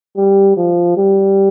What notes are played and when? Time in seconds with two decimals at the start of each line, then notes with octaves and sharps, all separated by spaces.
0.16 G3
0.57 F3
0.97 G3